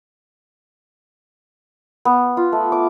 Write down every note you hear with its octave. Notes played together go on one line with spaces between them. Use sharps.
B3
F4
A3
D6